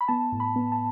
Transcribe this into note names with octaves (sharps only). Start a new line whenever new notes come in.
B5
B3 A5
A2
B5
B3
A5